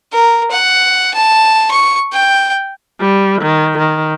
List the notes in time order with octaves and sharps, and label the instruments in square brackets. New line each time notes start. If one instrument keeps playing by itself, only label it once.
[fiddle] A#4
F#5
A5
C#6
G5
[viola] G3
D#3
D#3